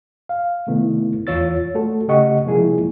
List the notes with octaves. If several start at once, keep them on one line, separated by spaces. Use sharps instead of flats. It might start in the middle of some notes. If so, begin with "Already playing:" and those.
F5
C3 D#3 A3 B3 E4
E2 E3 F4 C#5 E6 A6
A3 F#4 A4
C#3 A3 G4 D#5 F#5 C#6
C3 F3 G#3 A#3 E4 G#4